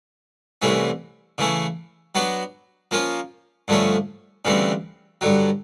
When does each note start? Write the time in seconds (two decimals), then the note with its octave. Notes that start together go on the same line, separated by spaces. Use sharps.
0.62 C2 C3 E3 A3 C#4
1.38 C#3 E3 A3 C#4
2.15 F#3 B3 D4 F#4
2.91 F3 A#3 C#4 F4
3.68 G2 D3 F3 A3 C#4
4.45 D2 C#3 E3 G3 C4
5.21 G2 D3 F#3